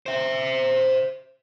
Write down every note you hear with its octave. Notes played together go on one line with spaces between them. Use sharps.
C5 E5